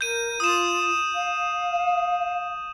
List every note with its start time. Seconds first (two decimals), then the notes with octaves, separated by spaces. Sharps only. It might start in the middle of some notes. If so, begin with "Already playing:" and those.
0.01 A#4 G6 D#7
0.40 F4 D#6 E7
1.14 F5